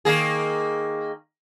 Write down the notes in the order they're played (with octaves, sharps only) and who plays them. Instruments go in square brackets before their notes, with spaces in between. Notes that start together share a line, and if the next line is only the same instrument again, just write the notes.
[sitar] D#3 A#3 G#4